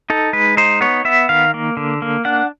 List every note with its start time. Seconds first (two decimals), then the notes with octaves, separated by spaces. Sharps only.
0.10 D#4 A4
0.33 G#3 B4
0.57 D#4 C5
0.81 B3 C#5
1.05 B3 E5
1.29 D#3 F5
1.54 A#3
1.77 D3
2.02 A#3
2.25 D4 F#5